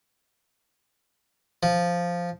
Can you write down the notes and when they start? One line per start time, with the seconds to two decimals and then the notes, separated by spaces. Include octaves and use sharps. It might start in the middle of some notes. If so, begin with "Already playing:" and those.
1.63 F3